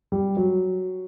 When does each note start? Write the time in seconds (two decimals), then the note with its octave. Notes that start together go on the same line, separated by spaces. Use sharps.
0.12 G3
0.37 F#3